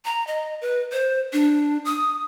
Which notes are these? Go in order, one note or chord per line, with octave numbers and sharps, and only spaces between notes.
A#5
D#5
B4
C5
D4
D#6